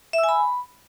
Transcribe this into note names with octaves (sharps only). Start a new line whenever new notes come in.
E5
E6
G#5
B5